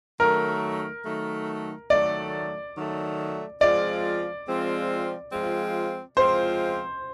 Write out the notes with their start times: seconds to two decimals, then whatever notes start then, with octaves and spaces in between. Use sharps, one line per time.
0.19 D#3 F#3 A3 A#4
1.05 D#3 F#3 A3
1.90 D#3 F#3 A3 D5
2.76 D#3 F#3 A3
3.61 F3 G#3 C4 F4 D5
4.47 F3 G#3 C4 F4
5.32 F3 G#3 C4 F4
6.17 F3 G#3 C4 F4 C5